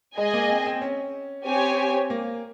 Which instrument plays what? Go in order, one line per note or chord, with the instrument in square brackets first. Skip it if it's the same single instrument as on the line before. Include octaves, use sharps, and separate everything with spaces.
[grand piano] G#3 [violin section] G#4 D#5 G#5
[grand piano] A#3
C4
C4
C#4
[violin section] C4 G4 C#5 G#5
[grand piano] A#3